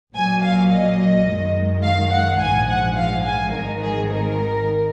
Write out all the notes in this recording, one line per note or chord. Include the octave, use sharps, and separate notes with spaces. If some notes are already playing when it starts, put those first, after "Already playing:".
A#1 A#2 F#3 G#5
F5
D#5
F#2 D#3 G#3
F5
F#5
A#1 G#2 F3 G#5
F#5
F5
G#5
G#1 G#2 D#3 A#4
G#4
A#4